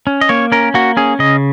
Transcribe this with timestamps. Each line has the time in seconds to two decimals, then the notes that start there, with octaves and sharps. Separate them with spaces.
0.07 C#4
0.21 D#5
0.29 A#3 C#5
0.52 C#4 A#4
0.74 A#3 F#4
0.97 C#4 G#4
1.19 C#3 D#5